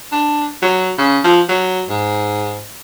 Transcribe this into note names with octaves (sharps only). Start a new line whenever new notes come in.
D4
F#3
C#3
F3
F#3
G#2